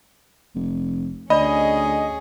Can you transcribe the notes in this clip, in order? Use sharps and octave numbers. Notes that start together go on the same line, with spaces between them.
F1
D2 C#4 G#4 D5 D#5 B5